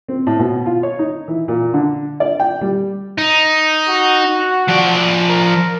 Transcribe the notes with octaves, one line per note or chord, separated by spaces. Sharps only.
C4
A2
B2
F4
C#5
D#4
E3
A#2
D3
D5
G5
G3
D#4
F#4
F3 D5
A#4